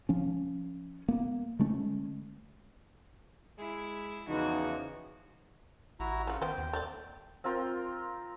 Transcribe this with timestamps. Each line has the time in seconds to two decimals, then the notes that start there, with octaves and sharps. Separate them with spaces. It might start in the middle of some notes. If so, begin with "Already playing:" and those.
0.09 F3 C#4
1.08 A#3 B3
1.59 D3 G#3 A3 C#4
3.59 G#3 E4
4.28 E2 C#3 E3 F3 D#4 F#4
6.00 A1 E4 F#4 A#5
6.27 C#3 F4 F#5
6.42 D#3 B3 C5 G5
6.58 D#2
6.73 A3 C4 D5
7.44 C4 F4 A#4 G5